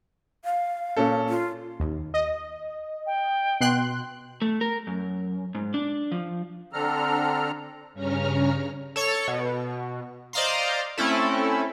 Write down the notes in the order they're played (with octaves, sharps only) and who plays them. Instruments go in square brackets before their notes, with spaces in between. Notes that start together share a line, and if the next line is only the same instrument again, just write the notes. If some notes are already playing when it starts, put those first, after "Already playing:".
[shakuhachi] F5
[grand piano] A#2 C#4 A4
[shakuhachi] F4
[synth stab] D#2
D#5
[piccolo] G5
[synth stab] B2 C6 F#6
[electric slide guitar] A3
A#4
F#2
G#2
D4
F3
[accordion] D3 C4 D4 A4 A#5 F6
[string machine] G2 C#3 C#4 C#5 A#5 F6
[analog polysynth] A4 C#5 C#6
B2
C5 D5 D#5 F5 A#5 C6
A3 C4 C#4 E4 A4